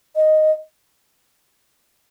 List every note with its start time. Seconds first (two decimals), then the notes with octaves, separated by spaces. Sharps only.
0.16 D#5